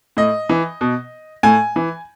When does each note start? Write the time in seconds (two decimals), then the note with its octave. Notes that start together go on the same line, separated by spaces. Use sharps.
0.17 A2 D#5
0.49 E3
0.81 B2
1.43 A2 G#5
1.76 E3